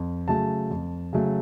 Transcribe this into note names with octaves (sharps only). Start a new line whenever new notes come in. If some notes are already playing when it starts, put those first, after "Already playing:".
Already playing: F2
C#3 F#3 A3 A5
F2
C#3 F#3 A3